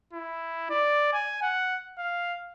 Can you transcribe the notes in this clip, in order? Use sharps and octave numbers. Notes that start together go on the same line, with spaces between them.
E4
D5
G#5
F#5
F5